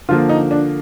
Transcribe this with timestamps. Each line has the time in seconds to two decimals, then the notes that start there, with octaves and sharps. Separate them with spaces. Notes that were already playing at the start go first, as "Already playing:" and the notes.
0.09 D3 F3 A#3 F4
0.29 D#4
0.51 D4